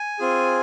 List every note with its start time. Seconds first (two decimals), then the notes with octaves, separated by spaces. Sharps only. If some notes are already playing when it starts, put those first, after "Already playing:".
Already playing: G#5
0.19 C4 F4 G#4